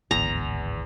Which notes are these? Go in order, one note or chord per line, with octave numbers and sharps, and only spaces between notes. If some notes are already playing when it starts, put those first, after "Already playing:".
D1 G#1 E2 D3 A#5